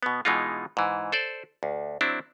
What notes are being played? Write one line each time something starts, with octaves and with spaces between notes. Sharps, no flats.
B2 B3
B2 E3 G#3 D#4 F4
G#2 E3
A4 C5 D5
D2
F#3 C4 D4 E4